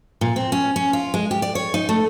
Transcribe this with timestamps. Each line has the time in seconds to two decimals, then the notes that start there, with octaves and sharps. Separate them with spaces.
0.21 A#2
0.36 C4
0.52 C#4
0.76 C#4
0.93 F4
1.14 G#3
1.31 G4
1.42 D5
1.55 C#5
1.74 D#4
1.89 A3